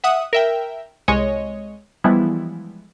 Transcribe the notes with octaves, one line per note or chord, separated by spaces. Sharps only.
E5 F#5 D#6
A#4 E5 G5
C2 G#3 C#5 D#5
E3 F3 G3 G#3 B3 E4